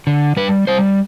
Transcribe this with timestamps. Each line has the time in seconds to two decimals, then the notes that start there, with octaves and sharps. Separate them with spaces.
0.07 D3
0.37 G3 B4
0.67 G3 C5